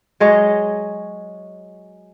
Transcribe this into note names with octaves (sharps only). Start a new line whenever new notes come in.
F#3 G#3 C#5 D#5